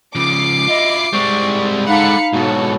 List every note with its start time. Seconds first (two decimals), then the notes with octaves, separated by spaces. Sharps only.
0.15 C#3 F3 D6 C7
0.68 E4 F4 D#5
1.13 G3 G#3 C4 C5 C#6
1.87 D#4 A4 F5 F#5 B5 C#7
2.33 G#2 B2 F#4 A4 C#5